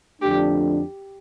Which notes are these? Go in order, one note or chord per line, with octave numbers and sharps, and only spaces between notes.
F2 D3 F3 A3 D4 G4